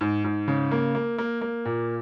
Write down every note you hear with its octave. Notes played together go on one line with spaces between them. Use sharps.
G#2
G#2
C#3
A#3
A#3
A#3
A#3
A#2